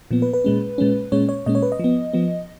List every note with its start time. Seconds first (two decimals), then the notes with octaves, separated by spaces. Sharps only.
0.11 A#2 F3 B3
0.22 B4
0.34 B4
0.44 A#2 G#3 C#4
0.78 A#2 G#3 C#4
1.12 A#2 G#3 C#4 C#5
1.29 C#5
1.46 A#2 G#3 C#4 D#5
1.55 C#5
1.63 B4
1.72 D#5
1.80 F3 B3
2.13 F3 B3